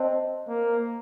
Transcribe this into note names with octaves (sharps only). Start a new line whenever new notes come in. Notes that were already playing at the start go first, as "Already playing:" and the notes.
Already playing: C4 C5 D#5 A5
A#3